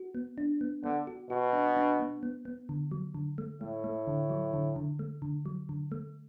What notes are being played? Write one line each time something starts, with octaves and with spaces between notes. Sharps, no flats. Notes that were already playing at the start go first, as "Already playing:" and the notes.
Already playing: F#4
B3
D4
B3
D3 B3
F#4
B2 F#4
D4
D4
B3
B3
B3
D3
F#3
D3
A3
A2 A3
A3
D3
F#3
D3
D3
A3
D3
F#3
D3
A3